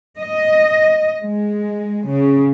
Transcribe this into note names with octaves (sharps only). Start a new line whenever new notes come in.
D#5
G#3
C#3